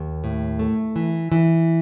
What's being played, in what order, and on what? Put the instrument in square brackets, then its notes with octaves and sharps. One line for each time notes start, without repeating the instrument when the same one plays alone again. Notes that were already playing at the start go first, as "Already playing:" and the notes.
Already playing: [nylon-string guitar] D#2
A2
A3
E3
E3